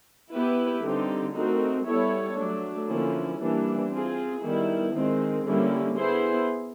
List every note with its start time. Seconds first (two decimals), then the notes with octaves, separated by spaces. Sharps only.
0.31 B3 E4 G4 B4
0.82 D3 G3 C4 D#4 G4
1.34 A3 C4 D#4 F#4 A#4
1.85 G3 B3 E4 A4 C#5
2.36 F#3 A3 D4
2.88 D3 F3 A#3 C#4 E4
3.39 E3 G3 A#3 D4
3.91 C4 F4 G#4
4.42 D#3 G3 B3 E4
4.93 D#3 G#3 C4
5.44 D3 G3 A#3 C#4 E4
5.96 B3 E4 G#4 C5